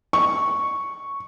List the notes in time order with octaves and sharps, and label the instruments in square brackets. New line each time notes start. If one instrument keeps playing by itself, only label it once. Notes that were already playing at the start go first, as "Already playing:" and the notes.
[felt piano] C#6